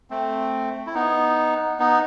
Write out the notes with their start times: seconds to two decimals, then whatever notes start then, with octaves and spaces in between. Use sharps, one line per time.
0.10 A3 C4
0.87 E4
0.95 B3 D#4
1.80 B3 D#4